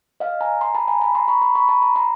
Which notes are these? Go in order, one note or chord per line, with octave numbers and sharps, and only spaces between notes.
D#5 F5
G#5 A#5
A#5 C6
A5 B5
G#5 A#5
A5 B5
A#5 C6
B5 C#6
A#5 C6
B5 C#6
A5 B5
A#5 C6
A#5 C6